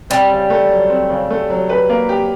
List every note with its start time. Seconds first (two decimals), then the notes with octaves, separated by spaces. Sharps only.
0.10 G3 C4
0.31 C#3
0.50 A3
0.71 F#3
0.90 C4
1.09 C#3
1.31 A3
1.50 F#3
1.69 B4
1.89 A#3
2.09 G4